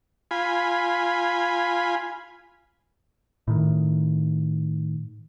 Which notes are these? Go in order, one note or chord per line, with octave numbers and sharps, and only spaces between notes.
F4 G#5 B5
A2 D#3